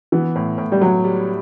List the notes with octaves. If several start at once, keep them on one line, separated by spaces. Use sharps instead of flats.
E3 B3
A2
A2
G3
A2 F#3
G3